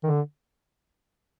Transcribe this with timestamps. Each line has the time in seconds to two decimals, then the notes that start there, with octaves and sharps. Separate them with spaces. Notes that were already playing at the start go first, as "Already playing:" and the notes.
0.04 D#3
0.07 D3